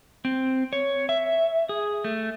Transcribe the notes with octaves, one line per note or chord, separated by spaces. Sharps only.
C4
C#5
E5
G#4
A3